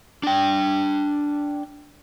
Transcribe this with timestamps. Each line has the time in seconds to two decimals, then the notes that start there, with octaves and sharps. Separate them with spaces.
0.23 D4 G5